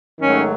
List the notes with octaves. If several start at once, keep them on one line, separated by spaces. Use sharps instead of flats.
G#2 D#3 F#3 A3 C#4